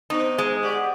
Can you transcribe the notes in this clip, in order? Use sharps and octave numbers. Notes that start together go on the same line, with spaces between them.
C3 B3 D#4 D#5
G#3
F#4 G4 D5